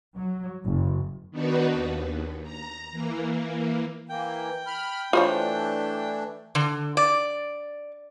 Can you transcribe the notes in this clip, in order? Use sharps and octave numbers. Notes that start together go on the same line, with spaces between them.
F#3
F#1
D#3 B3 D4 D#4 F#4 B4
D#2
A#5
E3 A#3
E3 A#3 G5
B5 F6
E3 A3 D4 F4 C5 C#5
D3
D5